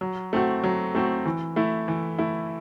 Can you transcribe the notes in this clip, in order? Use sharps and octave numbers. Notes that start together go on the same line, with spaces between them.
F#3
A3 C4 F#4
F#3
A3 C4 F#4
E3
A3 E4
E3
A3 E4